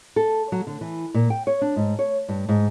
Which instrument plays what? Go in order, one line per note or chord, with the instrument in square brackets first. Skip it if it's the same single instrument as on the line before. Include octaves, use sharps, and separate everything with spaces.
[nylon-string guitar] A4
F#3
D3
E3
A#2
G5
C#5
D4
G#2
C#5
G2
G#2